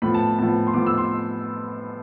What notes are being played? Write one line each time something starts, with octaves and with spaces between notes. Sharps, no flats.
A2 F3 B3 B5
A5
A2 F3 B3 A5
C6
A2 F3 B3 D6
E6
C6